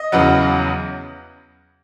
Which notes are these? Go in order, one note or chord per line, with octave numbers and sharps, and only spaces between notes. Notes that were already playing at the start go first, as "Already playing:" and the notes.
Already playing: D#5
E2 C#3 F#3 B3